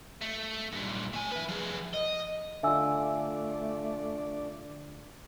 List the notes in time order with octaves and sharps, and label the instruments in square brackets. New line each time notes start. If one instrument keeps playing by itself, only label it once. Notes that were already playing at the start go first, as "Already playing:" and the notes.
[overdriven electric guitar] A3
G2 A#2
A3 G#5
E4 B4
F3 G#4
D#5
[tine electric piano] D3 F4 [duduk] A3 [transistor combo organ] D4 D5 [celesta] E5 G#5 E6